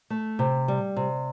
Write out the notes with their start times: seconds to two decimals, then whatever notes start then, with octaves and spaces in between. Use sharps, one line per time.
0.10 A3
0.39 C3
0.68 G3
0.96 C3